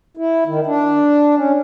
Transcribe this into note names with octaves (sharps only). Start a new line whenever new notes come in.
E4
D#3
D4
C#4